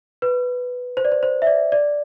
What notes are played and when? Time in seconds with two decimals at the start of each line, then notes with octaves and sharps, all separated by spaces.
0.22 B4
0.97 C5
1.05 D5
1.12 C5
1.23 C5
1.42 E5
1.47 D5
1.72 D5